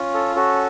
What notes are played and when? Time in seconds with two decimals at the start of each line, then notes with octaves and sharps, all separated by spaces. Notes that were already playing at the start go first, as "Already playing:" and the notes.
Already playing: C#4 F4
0.14 A4
0.35 C#4 F#4 A4